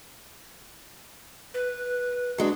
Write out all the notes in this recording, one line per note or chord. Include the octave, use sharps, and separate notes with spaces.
B4
F#3 G#3 D4